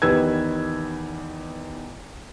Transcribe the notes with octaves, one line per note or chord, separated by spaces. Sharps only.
E2 D#3 G4 B4 E6 G#6